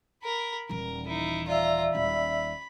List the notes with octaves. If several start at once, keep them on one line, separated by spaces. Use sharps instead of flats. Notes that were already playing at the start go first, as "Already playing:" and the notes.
A#4 B5
D#1 E3 A#4
D#4 E4
F4 D5 E5 A#5 E6
D#1 B5